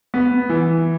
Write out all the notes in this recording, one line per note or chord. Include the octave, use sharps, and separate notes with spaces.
B3
E3